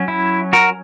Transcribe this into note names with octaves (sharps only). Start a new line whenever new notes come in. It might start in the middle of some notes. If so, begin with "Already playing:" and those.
Already playing: F#3 C#4
E4
F#4 A#4